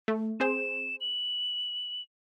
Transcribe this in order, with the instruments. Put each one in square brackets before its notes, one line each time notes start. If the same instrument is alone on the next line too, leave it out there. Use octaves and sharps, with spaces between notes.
[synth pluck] A3
[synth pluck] C4 G#4 C5 [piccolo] E7
[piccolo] F#7